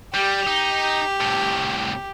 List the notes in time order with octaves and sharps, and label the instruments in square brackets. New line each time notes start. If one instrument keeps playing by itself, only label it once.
[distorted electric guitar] G3 [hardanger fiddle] G4
[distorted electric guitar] D#4
C2 A2